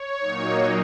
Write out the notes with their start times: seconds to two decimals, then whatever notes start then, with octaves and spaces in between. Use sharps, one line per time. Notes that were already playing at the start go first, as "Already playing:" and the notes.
Already playing: C#5
0.20 A#2 F#3 A#3 D#4